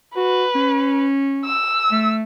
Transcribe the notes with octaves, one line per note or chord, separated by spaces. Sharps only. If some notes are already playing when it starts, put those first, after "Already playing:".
F#4 B4
C#4
E6
A3